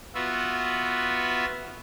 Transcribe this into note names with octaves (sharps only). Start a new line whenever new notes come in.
B3 F4 F#4 E5